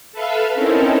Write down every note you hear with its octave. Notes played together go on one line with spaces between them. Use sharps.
A4 B4 E5 F5
C4 C#4 D#4 E4 A4 A#4